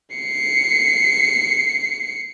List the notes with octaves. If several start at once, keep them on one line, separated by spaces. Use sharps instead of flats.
C7 C#7